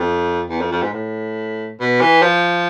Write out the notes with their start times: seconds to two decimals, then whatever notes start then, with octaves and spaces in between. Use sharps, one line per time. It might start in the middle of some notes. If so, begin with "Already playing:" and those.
Already playing: F2
0.50 E2
0.60 F2
0.71 F2
0.82 G#2
0.93 A2
1.80 B2
2.01 E3
2.22 F3